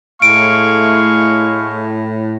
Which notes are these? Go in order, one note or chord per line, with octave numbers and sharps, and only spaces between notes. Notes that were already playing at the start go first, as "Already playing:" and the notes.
A2 G#3 A3 F5 C#6 D7